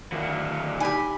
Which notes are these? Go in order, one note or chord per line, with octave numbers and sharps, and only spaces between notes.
D3 D#3 F#3 F5
D#4 G4 G#5 B5